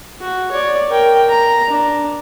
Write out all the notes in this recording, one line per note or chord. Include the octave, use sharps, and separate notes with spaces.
F#4
C#5 D5
A#4 G5
A#5
D4